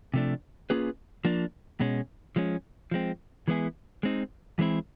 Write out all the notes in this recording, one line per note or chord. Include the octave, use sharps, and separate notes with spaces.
C3 F3 A3 D4
A#3 C#4 F4 G#4 B4
F3 A#3 D4
B2 G#3 C#4
F3 G#3 C#4
F3 G#3 C4
E3 G#3 B3 E4 G#4
G#3 C4 D#4
E3 G#3 C4 E4